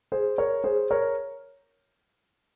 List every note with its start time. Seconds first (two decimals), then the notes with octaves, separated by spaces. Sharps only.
0.12 G#4 C5
0.38 A#4 C#5
0.64 G#4 C5
0.90 A#4 C#5